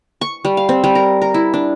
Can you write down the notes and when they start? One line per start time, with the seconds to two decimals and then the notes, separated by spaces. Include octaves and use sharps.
0.21 C#6
0.45 G3
0.57 F5
0.69 C4
0.84 G3
0.95 A#4
1.22 A#4
1.34 E4
1.54 D4